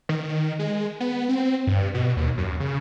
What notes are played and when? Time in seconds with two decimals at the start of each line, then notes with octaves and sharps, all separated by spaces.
0.09 D#3
0.59 G#3
1.00 B3
1.29 C4
1.67 G2
1.94 B2
2.17 D#2
2.38 F#2
2.60 C#3